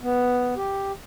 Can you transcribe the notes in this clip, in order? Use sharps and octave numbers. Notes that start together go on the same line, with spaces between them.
B3
G4